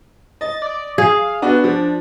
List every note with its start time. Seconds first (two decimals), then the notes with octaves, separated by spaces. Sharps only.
0.41 D#5 A6
0.62 D5
0.98 G#4 F5
1.42 B3 D4 F#4
1.64 F3